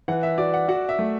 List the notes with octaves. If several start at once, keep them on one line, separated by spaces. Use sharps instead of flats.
E3 F#5
E5
F#4 D5
F#5
F#4 F#5
E5
A3